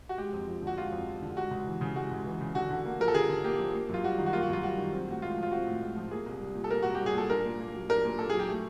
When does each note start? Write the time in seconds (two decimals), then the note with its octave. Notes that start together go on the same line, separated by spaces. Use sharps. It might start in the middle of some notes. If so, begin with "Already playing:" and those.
0.09 F#4
0.18 G#3 G4
0.33 F2
0.48 F3
0.62 D3 F#4
0.77 G#3 F4
0.92 F2
1.07 F3
1.22 D3
1.37 G#3 F#4
1.51 C#2
1.67 E3
1.81 C#3
1.96 G#3 F#4
2.11 C#2
2.26 E3
2.41 C#3
2.55 D3 F#4
2.70 D3
2.85 A#3
3.00 F3 A#4
3.08 A4
3.14 D3 G#4
3.30 D3
3.44 A#3 G4
3.59 F3
3.75 A#3
3.89 F#2 F4
4.04 G3 F#4
4.18 D#3
4.26 F#4
4.33 A#3 F4
4.43 F#4
4.48 F#2 F4
4.63 G3 F#4
4.78 D#3
4.93 C4
5.08 A2 F#4
5.22 G#3 F4
5.37 F3
5.43 F4
5.51 C4 F#4
5.67 A2
5.82 G#3
5.97 F3
6.11 A#3 G#4
6.26 C2
6.41 G3
6.55 A#2
6.64 A4
6.70 A#3 A#4
6.83 C2 F#4
6.95 G4
7.01 G3
7.06 G#4
7.15 A#2 A4
7.30 D4 A#4
7.45 A#2
7.59 A#3
7.75 F#3
7.89 D4 A#4
8.05 A#2
8.19 A#3 A4
8.30 G#4
8.34 F#3
8.39 G4
8.49 A3